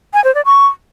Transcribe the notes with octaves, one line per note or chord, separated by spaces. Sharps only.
G#5
C5
D5
C#6